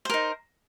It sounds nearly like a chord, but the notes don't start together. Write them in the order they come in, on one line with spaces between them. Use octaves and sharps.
C5 A#4 D#4